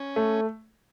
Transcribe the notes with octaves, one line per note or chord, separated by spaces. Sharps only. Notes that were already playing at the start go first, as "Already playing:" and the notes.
Already playing: C#4
A3